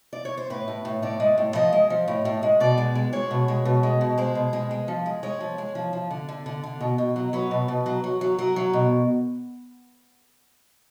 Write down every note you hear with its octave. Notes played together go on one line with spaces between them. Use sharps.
D5
C#5
C5
A2 B4
A2
A2
A2 D5
G#3
A2
F3 D#5
G#3
F3
A2
A2
G#3
B2 D5
G#3
G#3
G#3 C#5
B2
G#3
B2
G#3
B2
G#3 C5
B2
G#3
G#3
F3
G#3
G#3 C#5
F3
G#3
F3
F3
D3
D3
D3
D3
B2
B2
F#3
F#3 B4
B2
B2
F#3
F#3
F#3
F#3 A#4
F#3
B2